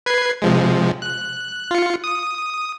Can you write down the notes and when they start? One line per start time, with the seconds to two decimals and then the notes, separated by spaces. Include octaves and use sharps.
0.06 B4 G#6 C7
0.42 C3 F3 G#3
1.02 F#6
1.71 F4 C#7
2.04 D#6